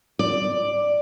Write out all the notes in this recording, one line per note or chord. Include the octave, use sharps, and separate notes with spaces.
D5